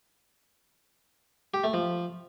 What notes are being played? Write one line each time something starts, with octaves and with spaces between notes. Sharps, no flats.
G4
A3
F3